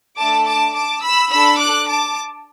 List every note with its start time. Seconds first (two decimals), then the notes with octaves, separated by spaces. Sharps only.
0.18 A3 D4 A4 A5 D6
0.47 A5 D6
0.75 A5 D6
1.03 B5 E6
1.32 D4 A4 B5 E6
1.60 D6 F#6
1.88 A5 D6